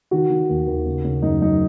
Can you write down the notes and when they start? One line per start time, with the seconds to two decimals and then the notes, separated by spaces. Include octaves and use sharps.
0.11 D#3 F#4
0.30 D#3
0.49 D#2
0.67 D#2
0.86 C#3
1.04 C#3
1.22 F#2 D#4
1.42 F#2 D#4